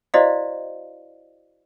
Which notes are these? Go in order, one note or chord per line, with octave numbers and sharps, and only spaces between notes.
E4 F#4 C5 D5 D#5 F5